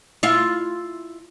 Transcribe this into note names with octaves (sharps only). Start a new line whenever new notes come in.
E4 F4